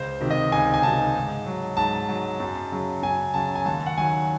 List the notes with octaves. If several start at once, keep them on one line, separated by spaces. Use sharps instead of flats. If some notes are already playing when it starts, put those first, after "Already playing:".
Already playing: C#2 C5
C3 D#3
D#5
C#2 G#5
G#5
C3 D#3 A5
G#2
F#3
G#2 A5
F#3
F#2
C#3 F#3
F#2 G#5
C#3 F#3 A5
G#5
D#2 A5
F#5
D#3 F#3 G#5